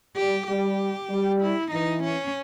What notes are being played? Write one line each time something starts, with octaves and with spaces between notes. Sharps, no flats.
G3 G4
G3 G4
G3
E4
E3 D#4
C#4